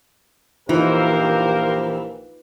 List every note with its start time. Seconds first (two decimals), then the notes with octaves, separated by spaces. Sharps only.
0.69 A#1 E3 A#3 D#4 F4 G4 A#4 C5